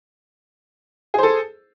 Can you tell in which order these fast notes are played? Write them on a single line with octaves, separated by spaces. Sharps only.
G#4 C5 A4